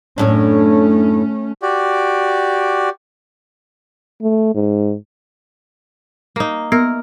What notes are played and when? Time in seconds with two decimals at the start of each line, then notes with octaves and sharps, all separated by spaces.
0.18 F#2 A2 A3 C#4 D4
1.62 F#4 G4 D5
4.22 A3
4.55 G#2
6.36 A#3 D#4
6.72 B3 A#4